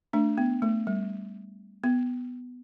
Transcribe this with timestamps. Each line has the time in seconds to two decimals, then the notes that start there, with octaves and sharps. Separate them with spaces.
0.13 A3 D4
0.38 B3
0.62 A3
0.87 G3
1.84 B3